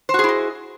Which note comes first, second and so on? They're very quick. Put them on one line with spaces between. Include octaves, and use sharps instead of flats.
C5 F#4 G#4 E4 D#5